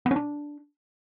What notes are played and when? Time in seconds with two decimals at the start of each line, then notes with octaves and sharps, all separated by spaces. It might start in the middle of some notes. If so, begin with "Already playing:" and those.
0.06 B3
0.11 C#4
0.16 D4